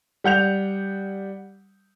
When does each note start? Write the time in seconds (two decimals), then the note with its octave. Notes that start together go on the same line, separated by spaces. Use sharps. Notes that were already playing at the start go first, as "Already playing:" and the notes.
0.24 G3 F#5 G6 F7